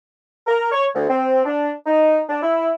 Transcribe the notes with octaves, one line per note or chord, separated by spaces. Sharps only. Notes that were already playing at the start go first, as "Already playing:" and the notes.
A#4
C#5
D2
C4
D4
D#4
D4
E4